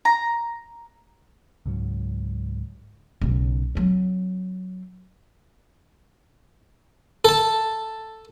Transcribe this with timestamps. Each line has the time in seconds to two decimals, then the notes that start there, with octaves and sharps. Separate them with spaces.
0.05 A#5
1.66 C#2 G#2 F#3
3.22 B1 C#3
3.75 F#3 C4
7.25 A4 A5